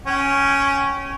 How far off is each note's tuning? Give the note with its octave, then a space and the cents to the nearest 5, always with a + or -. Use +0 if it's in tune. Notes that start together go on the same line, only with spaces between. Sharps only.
C#4 +0 G5 -30